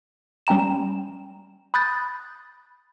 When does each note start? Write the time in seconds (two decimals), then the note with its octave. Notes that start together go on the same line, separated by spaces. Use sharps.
0.47 G3 C#4 G5 A#5 E7
1.74 B5 D#6 F#6 G6 A6